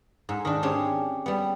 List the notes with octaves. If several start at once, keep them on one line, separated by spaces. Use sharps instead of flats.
G#2
D#3 D4
C4 C#4 G4 G#4 C#5
G3 B3